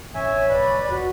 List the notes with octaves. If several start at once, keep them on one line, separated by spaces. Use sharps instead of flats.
E1 A1 C#4 C#5 E5 G#5
B1 G#2 B4 D5 B5
D2
D#1 D#2 F#4